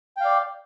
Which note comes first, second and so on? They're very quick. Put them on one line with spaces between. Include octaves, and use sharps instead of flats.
G5 F5 D5